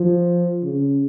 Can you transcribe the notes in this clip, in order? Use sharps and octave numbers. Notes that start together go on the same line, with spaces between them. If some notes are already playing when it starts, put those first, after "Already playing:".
Already playing: F3
C#3